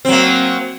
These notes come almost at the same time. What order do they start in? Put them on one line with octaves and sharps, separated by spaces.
C4 F#3 A#3